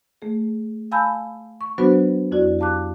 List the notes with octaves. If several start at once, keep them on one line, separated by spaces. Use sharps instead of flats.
A3 G#4
F5 G#5 A5 B5 E6 G6
C#6
F#3 B3 D4 F#4 B4 C5
F2 E4 F#4 D5
G4 F5 A5 D6 F#6